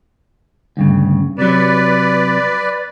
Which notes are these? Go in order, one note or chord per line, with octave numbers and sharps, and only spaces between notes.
D2 G2 C#3
C3 F#3 B4 D5